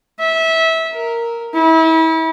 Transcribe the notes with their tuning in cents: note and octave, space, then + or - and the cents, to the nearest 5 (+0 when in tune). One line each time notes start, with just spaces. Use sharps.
E5 -20
A#4 -5
E4 -35